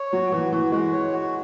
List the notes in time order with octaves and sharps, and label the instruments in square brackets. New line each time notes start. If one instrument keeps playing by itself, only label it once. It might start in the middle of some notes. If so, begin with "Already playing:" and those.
Already playing: [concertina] C#5
[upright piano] F#3 [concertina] F#4
[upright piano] E3 [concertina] F#4
[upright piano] E3 [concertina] F#4
[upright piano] G#3 [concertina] F#4
[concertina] C#5
F#4